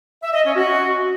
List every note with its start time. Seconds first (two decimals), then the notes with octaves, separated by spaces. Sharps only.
0.22 E5
0.33 D#5
0.44 C#4
0.56 F#4